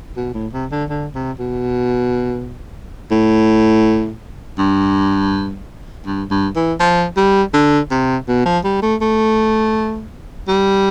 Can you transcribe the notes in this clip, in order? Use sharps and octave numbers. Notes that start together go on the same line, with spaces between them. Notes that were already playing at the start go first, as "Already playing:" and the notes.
B2
A2
C3
D3
D3
C3
B2
A2
G2
G2
G2
E3
F3
G3
D3
C3
B2
F3
G3
A3
A3
G3